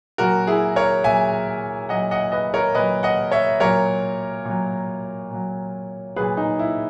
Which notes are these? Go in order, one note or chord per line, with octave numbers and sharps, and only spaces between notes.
A#2 F#3 F#4 A#4
E4 G#4
A#4 C#5
A#2 F#3 E5 G#5
A#2 F#3 D#5 F#5
D#5 F#5
B4 D#5
A#4 C#5
A#2 F#3 B4 D#5
D#5 F#5
C#5 E5
A#2 F#3 A#4 C#5
A#2 F#3
A#2 F#3
A#2 F#3 G#4 B4
D#4
E4